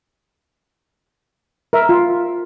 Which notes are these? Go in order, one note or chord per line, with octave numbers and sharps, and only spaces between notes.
A#4 E5
F4